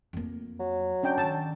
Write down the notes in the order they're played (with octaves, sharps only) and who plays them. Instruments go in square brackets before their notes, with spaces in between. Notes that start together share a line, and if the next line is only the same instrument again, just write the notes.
[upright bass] F2 A#3
[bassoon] F#3
[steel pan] C#4 D4 G5
[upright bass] D#3 [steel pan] A5